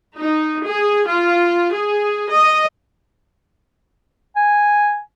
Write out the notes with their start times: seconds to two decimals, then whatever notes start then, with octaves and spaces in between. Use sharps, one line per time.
0.18 D#4
0.65 G#4
1.06 F4
1.72 G#4
2.30 D#5
4.36 G#5